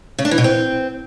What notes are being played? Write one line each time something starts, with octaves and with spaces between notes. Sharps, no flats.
C#3
D4
E3
B2
C4